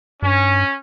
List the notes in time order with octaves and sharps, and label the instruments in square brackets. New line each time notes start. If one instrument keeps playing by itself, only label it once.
[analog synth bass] G2 [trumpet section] C#4